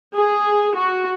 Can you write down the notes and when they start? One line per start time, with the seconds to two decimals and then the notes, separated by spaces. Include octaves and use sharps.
0.15 G#4
0.76 F#4